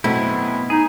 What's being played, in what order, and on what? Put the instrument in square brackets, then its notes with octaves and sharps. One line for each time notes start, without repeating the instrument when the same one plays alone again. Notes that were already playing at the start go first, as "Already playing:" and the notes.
[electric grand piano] F#2 A3 C4 [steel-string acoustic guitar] B2 [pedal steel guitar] E4
[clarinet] D#4 [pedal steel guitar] G#4